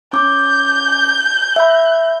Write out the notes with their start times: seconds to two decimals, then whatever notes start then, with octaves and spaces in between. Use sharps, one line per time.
0.13 C#4 D6 G6
1.56 E5 B5